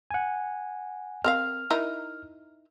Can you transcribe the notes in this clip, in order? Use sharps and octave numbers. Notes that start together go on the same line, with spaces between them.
F#5 G#5
C4 A#4 F5 F6
D#4 E4 A#4